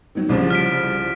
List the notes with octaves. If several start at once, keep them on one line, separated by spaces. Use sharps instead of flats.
D#3 F#3
C2 C#3 F3
F6 B6 D7